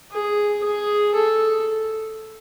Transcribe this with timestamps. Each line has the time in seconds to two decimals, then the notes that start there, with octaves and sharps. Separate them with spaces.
0.12 G#4
0.64 G#4
1.15 A4